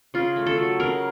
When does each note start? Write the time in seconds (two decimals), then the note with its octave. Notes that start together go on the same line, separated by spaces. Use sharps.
0.14 C#3 F4
0.36 A3
0.46 A4
0.58 F#3
0.80 C#3 A#4